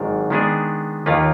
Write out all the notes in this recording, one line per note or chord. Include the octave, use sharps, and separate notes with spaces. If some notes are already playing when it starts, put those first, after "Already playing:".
Already playing: G#1 G#2 D#3 F#3 D4
D#3 G#3 B3 D4 G#4
D#2 D#3 A#3 F4 B4